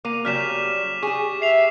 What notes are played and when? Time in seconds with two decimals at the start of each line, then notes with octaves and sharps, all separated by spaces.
0.05 A#3 D6 D#7
0.25 C#3 F#3 G3 F6 B6 E7
1.03 G4 G#4 C#6
1.42 E5 C7 F7